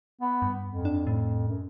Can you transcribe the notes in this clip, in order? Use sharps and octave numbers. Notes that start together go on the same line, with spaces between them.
B3
G2
F2
D4
A2
F#2